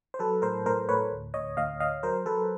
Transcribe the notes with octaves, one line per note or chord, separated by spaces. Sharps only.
C5
F#3 A4 B4
A2 A#4 C5
A2 A#4 C5
A2 B4 C#5
D2
D2 C#5 D#5
D2 D#5 F5
D2 D#5 F5
F#3 A#4 C5
F#3 A4 B4